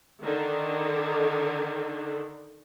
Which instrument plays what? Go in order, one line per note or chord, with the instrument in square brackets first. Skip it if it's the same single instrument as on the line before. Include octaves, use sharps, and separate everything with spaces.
[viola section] D3 D#3